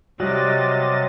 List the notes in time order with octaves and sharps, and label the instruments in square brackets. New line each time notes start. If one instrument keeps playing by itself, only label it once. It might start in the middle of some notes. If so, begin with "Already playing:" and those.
[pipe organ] C3 D#5 A6 [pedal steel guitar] F#3 F#4 D5 [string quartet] G3